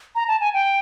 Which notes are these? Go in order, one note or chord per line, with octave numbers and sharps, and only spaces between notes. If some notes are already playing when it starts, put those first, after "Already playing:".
A#5
A5
G#5
G5